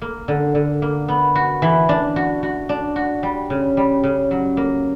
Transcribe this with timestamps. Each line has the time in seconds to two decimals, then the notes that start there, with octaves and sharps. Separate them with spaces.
0.02 A#3
0.28 D3
0.55 D3
0.82 A#3
1.08 B3
1.35 F#4
1.62 E3
1.89 D4
2.16 F#4
2.43 F#4
2.69 D4
2.96 F#4
3.23 G3
3.50 C#3
3.77 G3
4.04 C#3
4.31 F#3
4.57 A#3